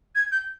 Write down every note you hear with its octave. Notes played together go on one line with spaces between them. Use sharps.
G#6
G6